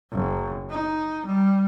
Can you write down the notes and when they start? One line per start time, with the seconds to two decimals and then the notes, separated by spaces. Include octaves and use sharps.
0.12 F#1
0.70 D#4
1.26 G3